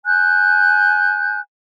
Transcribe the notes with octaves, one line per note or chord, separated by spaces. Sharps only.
G#5 F#6 G6